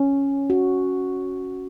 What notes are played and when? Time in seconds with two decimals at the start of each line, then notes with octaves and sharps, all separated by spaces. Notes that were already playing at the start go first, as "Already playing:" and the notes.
Already playing: C#4
0.50 F#4